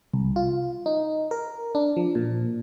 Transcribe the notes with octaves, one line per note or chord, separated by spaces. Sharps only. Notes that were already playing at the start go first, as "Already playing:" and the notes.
C2
F4
D#4
A#4
D4
F3
A#2